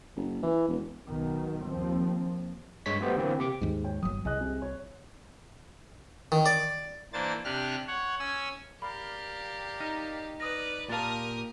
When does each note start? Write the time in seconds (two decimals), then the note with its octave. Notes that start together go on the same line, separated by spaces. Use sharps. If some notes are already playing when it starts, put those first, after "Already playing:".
0.16 F#1
0.43 E3
0.68 E1
1.08 B1 B2 D#3
1.69 D#2 F3 C4
2.86 G2 G#3 C#5 B6
3.00 F#3 A3 B3 G4 C5
3.16 D3 E3 A#3 C4
3.39 C3 G4 D6
3.61 D#2 G#2 G#3
3.84 C#5 G5
4.03 G1 F#3 D#6
4.25 C2 G#4 D#5 F#6
4.40 C3 G#4
4.62 C#5
6.32 D#3
6.46 D5
7.13 E3 A#3 D4 C5 A6
7.45 C3 D4 G4 F6 F#6
7.88 C#5 F#5
8.19 C#4 G#5 E6
8.82 G4 A#4 D5 F5 B5
9.80 D#4 F6
10.40 B4 D5 D#5 D#6 F6 A#6
10.89 A#2 G4 A#4 F5 A5 D#6 A6